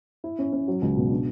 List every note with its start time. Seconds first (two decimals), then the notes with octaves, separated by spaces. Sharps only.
0.24 E4
0.39 C#4
0.53 C#4
0.68 F#3
0.82 C#2
0.97 B2
1.11 D4